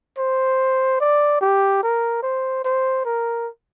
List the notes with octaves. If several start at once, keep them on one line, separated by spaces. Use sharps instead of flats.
C5
D5
G4
A#4
C5
C5
A#4